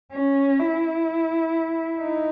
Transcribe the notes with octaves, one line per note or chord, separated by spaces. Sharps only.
C#4
E4
D#4